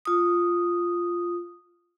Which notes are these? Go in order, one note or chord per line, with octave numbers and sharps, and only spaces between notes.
F4 D#6